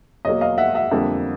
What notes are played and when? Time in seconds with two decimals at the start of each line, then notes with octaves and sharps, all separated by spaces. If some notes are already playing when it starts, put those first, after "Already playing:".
0.25 E2 B2 F#3 A#3 C#5 D#5
0.41 D#5 F5
0.58 E5 F#5
0.74 E5 F#5
0.91 F2 D3 G3 A#3